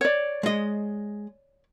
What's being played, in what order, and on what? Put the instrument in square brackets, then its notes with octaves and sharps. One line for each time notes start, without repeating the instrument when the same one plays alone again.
[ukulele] C#5 D5
[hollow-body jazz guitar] G#3 D#5